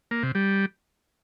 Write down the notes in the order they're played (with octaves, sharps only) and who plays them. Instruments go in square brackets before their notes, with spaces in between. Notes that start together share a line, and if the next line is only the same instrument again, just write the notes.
[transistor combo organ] A#3
C3
G3